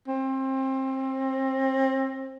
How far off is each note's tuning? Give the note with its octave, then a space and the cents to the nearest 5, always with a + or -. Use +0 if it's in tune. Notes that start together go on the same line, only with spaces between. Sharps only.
C4 +25